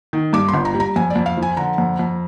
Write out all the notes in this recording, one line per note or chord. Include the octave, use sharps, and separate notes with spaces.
D#3
G2 D6
C6
G1
A#5
G3
A#5
F2 G#5
D5
F2
F5
F3
G#5
D3 A#5
F2
F2